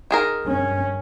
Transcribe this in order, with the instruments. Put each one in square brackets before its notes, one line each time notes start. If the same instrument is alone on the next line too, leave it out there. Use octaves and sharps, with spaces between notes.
[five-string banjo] D#3 G#4 A#4
[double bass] G2 C#4